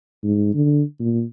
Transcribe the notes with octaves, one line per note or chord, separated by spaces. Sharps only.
G#2
D3
A#2